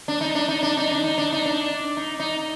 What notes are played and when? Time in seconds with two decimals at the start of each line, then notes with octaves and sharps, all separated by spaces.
0.08 D4
0.21 D#4
0.35 D4
0.49 D#4
0.63 D4
0.77 D#4
0.91 D4
1.04 D#4
1.18 D4
1.33 D#4
1.46 D4
1.97 D#4
2.20 D#4